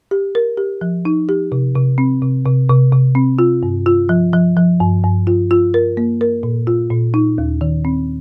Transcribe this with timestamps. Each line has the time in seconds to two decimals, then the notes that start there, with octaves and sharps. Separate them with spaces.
0.11 G4
0.35 A#4
0.57 G4
0.81 F3
1.05 D#4
1.29 G4
1.52 C3
1.75 C3
1.98 C4
2.22 C3
2.45 C3
2.69 C3
2.93 C3
3.15 C4
3.39 F4
3.63 G2
3.86 F4
4.09 F3
4.33 F3
4.57 F3
4.80 G2
5.04 G2
5.27 F4
5.51 F4
5.74 A#4
5.97 A#3
6.21 A#4
6.43 A#2
6.67 F4
6.91 A#2
7.14 D#4
7.38 D#2
7.61 D#3
7.85 C4